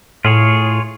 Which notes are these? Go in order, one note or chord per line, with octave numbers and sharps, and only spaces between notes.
A2 F4 G#4 C#5